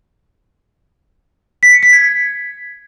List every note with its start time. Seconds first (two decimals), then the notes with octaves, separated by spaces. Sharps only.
1.63 B6
1.73 C#7
1.83 B6
1.93 G#6